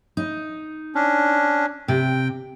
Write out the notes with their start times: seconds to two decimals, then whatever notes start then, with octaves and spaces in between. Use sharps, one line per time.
0.17 D#4
0.95 C#4 D4
1.88 C3 G5